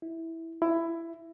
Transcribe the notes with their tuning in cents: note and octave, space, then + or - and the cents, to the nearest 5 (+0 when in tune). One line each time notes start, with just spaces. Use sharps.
E4 -10
E4 +15